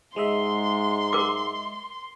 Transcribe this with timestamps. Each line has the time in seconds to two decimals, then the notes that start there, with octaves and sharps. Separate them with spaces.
0.16 G#2 G#3 D#5 E5 C6
1.13 A#4 D6